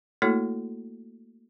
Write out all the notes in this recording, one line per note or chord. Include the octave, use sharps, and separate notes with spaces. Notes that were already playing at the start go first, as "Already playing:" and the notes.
A3 A#3 E4 F#4 A4 C#5